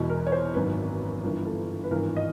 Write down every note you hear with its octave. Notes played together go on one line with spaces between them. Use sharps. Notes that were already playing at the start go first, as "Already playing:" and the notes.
Already playing: E1 E2 B2
A#4
C#5
C5
G#1 F#2 D#3 B4
G1 G2 E3 A#4
A4
B4
G#1 G2 E3 A#4
D#5